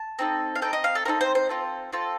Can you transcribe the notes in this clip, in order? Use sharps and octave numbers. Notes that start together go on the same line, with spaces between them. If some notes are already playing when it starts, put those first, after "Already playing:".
Already playing: A5
C4 D#4 A4
F5
C4 D#4 A4 G5
D#5
F5
A4
C4 D#4 A4 A#4
C5
C5
C4 F4 A4
C4 F4 A4